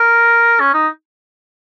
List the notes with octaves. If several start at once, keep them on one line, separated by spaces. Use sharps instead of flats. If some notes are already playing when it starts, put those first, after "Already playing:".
Already playing: A#4
C#4
D#4